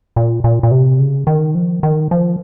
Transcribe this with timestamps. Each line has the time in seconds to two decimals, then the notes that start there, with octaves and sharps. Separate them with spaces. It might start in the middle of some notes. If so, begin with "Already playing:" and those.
0.16 A#2
0.44 A#2
0.63 A#2
0.71 C3
0.99 C#3
1.27 D#3
1.55 F3
1.83 D#3
2.11 F3